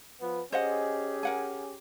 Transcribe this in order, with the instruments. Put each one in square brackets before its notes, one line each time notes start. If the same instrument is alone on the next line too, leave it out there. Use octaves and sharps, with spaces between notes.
[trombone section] F3 B3
[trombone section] C#4 G4 G#4 [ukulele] C5 D#5 F#5
[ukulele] A#4 F#5 G#5